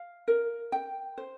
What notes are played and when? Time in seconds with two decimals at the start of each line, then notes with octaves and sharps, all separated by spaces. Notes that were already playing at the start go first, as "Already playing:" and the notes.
Already playing: F5
0.28 A#4
0.72 G5
1.18 C5